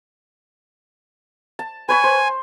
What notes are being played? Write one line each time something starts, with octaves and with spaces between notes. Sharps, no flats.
A5
B4 C#5 G#5 B5
C5